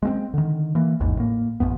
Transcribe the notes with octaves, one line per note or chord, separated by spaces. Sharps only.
G#3 A#3 C4
D3 D#3
E3 A#3
A1 E2 G#2
A2 A#3
A1 F#2 B3